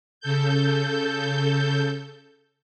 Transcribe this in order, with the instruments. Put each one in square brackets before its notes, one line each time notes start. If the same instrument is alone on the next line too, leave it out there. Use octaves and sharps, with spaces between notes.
[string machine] C#3 A4 G6